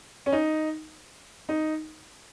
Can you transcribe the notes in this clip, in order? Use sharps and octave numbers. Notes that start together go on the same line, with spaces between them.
C#4
D#4
D#4